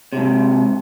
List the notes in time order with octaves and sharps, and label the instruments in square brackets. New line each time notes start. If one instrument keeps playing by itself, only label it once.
[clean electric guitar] G#2 C3